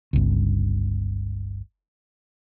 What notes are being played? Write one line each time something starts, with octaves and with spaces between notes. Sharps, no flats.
G1 C#2